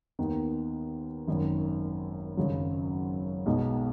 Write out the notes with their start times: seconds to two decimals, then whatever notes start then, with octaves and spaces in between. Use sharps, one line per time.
0.19 D#2 D#3 B3
1.28 G#1 F#2 D#3
2.37 G#1 F#2 C#3 F#3
3.46 B1 B2 G#3 D#4